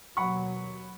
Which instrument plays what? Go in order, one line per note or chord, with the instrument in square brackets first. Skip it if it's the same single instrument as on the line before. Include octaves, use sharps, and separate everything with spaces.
[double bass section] D#2 B2 F#3 [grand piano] F#5 B5 C#6